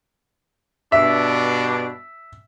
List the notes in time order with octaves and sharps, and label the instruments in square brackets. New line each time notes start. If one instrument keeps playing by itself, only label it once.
[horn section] G2 B2 D4 [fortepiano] E5